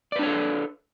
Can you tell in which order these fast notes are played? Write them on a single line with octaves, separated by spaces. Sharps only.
D5 B4 D4 C#5 A4